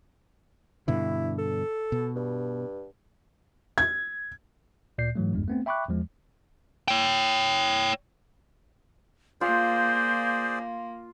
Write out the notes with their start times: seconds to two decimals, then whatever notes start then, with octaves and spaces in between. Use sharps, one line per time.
0.88 G2 B2 D3 E4
1.38 A4
1.92 B2
2.16 G2
3.78 G#6
4.98 D2 A#2 D5 G6 C7
5.15 G#2 E3 F#3 A3
5.33 G1 E2 G2 G#3
5.48 A3 B3 C4
5.66 E5 G5 B5 C#6 D6 F#6
5.89 E2 F3 G#3
6.88 C#5 G5
9.41 A#3 F4 G#4 C5 D5 G6